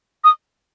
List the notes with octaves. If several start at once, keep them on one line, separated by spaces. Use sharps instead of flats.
D#6